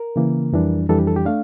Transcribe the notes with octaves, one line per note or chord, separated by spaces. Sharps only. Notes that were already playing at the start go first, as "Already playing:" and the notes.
Already playing: A#4
C#3 E3 A#3
F2 E3 G3 D4
F2 E3 G3 D4 A4
G4
A4
G4
A3 D4 F5